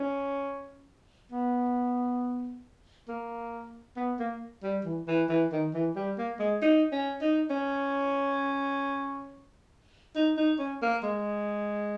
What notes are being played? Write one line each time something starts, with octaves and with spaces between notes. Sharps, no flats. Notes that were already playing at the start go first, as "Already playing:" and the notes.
Already playing: C#4
B3
A#3
B3
A#3
G3
E3
E3
E3
D#3
E3
G3
A#3
G#3
D#4
C#4
D#4
C#4
D#4
D#4
C#4
A#3
G#3